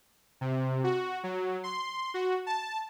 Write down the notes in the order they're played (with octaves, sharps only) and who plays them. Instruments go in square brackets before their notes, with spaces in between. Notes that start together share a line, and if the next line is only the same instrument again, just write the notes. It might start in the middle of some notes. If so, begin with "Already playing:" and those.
[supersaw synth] C3
F#4
F#3
C6
F#4
A5